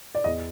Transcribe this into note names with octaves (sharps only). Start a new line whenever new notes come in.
D5
E2 D#5